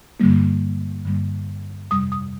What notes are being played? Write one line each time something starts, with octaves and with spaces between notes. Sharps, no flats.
G2 D3 G3 A#3
G2 D3 G3 A#3
F2 C3 G3 D#6
D#6